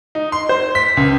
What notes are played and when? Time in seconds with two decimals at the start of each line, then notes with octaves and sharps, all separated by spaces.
0.15 D#4
0.32 C6
0.49 C5
0.75 B6
0.97 C#2